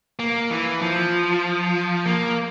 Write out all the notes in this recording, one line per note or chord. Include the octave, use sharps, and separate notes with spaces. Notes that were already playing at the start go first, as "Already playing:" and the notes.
A#3
E3
F3
A#3